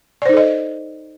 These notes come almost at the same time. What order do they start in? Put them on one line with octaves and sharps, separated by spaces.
D5 C5 D#4 A4 D#5